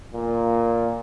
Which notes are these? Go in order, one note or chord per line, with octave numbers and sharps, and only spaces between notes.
A#2